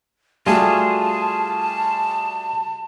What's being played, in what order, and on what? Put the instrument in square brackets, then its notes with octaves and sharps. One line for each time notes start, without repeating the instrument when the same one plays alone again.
[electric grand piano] G3 A3 F#4 [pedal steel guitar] F4 G#4 [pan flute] A5